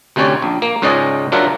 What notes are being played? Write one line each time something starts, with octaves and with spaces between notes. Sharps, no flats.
D2 C3 C4 C#4 C#5 D5
A#1
A#3
C#2 G#2 C#4 G#4 D5 D#5
F#3 D4 F4 A#4 E5 F#5